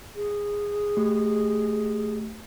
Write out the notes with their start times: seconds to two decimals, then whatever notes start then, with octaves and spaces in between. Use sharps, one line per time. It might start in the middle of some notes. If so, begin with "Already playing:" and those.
0.15 G#4
0.97 A3 G4